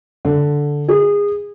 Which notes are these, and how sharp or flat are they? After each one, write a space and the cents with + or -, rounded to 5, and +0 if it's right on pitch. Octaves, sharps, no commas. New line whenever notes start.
D3 -5
G#4 -25